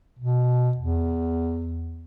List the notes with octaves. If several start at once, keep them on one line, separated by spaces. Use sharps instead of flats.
B2
E2